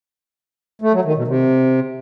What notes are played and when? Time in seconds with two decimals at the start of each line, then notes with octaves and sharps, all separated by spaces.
0.82 A3
0.93 F#3
1.05 D#3
1.16 B2
1.28 C3